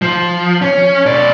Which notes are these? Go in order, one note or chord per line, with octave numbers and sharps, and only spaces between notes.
F3
C#4
B2 D5